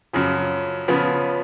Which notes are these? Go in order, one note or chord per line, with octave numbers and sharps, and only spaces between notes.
F#2 C#3 F3
C#3 F3 B3